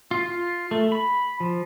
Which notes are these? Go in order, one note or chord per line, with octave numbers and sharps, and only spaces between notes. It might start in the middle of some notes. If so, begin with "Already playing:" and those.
F4
F4
A3
B5
F3